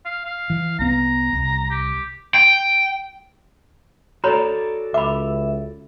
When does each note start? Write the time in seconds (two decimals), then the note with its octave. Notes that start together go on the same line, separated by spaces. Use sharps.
0.05 F5
0.25 F5
0.50 E3
0.79 C2 B3 A#5
1.33 C2
1.70 G4
2.34 G5
4.24 F#4 A4 C#5 D5 A#5 B5
4.94 C#2 E5 B5 D6